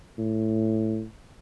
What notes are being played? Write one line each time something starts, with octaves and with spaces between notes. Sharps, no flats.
A2